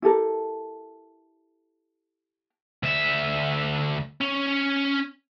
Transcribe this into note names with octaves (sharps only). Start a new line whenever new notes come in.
E4 G4 A4 A#4
D2 E5
C#4